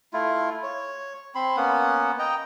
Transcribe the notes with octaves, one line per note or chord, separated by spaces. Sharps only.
A3 E4 F4
C#5
C4 B5 C6
A#3 B3 C#4 F#5
D#5 G5 A#5